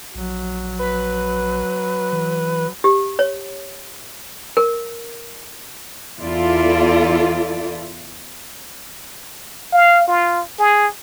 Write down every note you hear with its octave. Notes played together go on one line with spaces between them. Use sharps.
A#1 F#3
B4
E3
G4
C#5
A#4
E2 E4 F4 A4 D5
F5
F4
G#4